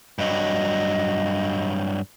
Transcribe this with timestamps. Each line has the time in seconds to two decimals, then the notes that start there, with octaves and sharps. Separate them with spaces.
0.19 G2 F#3 D#5